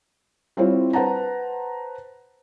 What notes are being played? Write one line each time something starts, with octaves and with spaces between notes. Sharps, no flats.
G3 C4 E4 F4 C5 C#5
B4 C5 F#5 A5 A#5